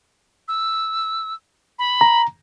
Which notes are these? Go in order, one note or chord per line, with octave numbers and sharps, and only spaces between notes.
E6
B5
A#5